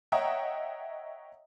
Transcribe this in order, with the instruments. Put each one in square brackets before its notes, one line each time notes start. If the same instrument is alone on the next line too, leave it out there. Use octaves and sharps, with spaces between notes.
[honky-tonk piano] C#5 D#5 E5 F#5 G5 A#5